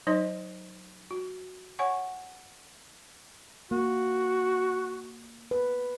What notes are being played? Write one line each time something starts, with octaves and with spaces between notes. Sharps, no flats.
F#3 D#4 C5 D#5 C6
F#4
C#5 F#5 G#5 C#6
A#3 F#4
B4